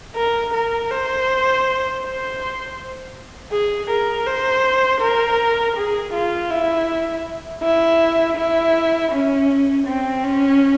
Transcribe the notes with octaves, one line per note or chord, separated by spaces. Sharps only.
A#4
A#4
C5
C5
G#4
A#4
C5
A#4
G#4
F4
E4
E4
E4
C#4
C4
C#4